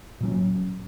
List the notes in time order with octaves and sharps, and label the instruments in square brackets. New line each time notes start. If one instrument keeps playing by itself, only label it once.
[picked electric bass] A#2 F#3 C#4